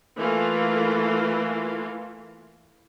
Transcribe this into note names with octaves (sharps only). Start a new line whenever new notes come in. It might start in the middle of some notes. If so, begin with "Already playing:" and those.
E3 A3 A#3 F4